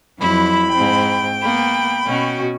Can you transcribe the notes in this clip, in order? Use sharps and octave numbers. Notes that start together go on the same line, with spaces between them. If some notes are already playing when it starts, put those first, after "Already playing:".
F2 F#3 E4 B5
G#2 C4 G5
A#3 B3 B5
B2 C#4 F#4